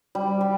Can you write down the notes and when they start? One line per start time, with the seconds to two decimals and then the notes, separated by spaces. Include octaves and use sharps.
0.15 G3
0.41 G3